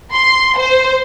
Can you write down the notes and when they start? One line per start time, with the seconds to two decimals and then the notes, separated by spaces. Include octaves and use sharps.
0.13 C6
0.59 C5